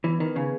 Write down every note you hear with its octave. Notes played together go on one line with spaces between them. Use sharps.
E3 B3
D#3 B4
C#3 G#4